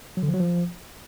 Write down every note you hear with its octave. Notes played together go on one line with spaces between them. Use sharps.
F#3
D3
F3
F#3
F3